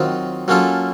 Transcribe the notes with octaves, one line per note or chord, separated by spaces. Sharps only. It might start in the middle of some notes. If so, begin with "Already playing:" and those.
Already playing: D#3 F#3 C4 F4
F#3 A#3 C#4 F4 A4